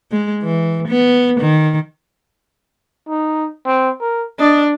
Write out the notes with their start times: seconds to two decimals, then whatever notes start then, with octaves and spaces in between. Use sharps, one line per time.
0.11 G#3
0.43 E3
0.88 B3
1.41 D#3
3.09 D#4
3.65 C4
4.01 A#4
4.40 D4 D#5